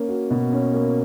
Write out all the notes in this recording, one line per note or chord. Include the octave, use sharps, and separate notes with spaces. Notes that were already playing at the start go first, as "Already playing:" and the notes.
Already playing: A#3 C#4
F#4
B2
C#4
A#3